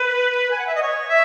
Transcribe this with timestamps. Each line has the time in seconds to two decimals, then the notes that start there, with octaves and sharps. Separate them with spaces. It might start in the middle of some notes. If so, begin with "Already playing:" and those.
Already playing: B4
0.51 G#5
0.58 F#5
0.67 E5
0.75 D#5
0.82 C#5
1.09 E5